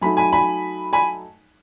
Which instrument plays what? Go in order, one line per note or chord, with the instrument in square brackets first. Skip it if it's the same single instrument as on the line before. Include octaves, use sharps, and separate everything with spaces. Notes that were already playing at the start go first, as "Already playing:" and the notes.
[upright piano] F#3 A3 D#4 G#5 B5
G#5 B5
G#5 B5
G#5 B5